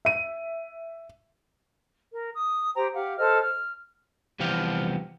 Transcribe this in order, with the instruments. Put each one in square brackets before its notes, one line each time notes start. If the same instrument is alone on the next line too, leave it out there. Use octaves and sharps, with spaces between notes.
[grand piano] E5 D#7
[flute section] A#4
D#6
G4 C5 G5 A#5
G4 F5 F#5
A4 C5 D#5 F6
F6
[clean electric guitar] C2 E3 F3 B3 G4 F5